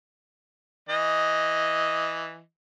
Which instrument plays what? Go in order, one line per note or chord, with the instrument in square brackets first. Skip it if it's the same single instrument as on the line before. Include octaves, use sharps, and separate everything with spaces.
[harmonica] E3 D#5